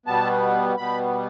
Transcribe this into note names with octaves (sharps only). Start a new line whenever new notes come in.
B2 G3 B3 A5
B2 G3 B3 B5